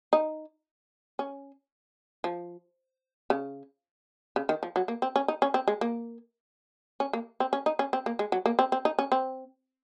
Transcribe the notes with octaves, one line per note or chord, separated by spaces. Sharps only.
D#4
C#4
F3
C#3
C#3
D#3
F3
F#3
A#3
C4
C#4
D#4
C#4
C4
G#3
A#3
C#4
A#3
C4
C#4
D#4
C#4
C4
A#3
G#3
F#3
A#3
C4
C4
D#4
C#4
C4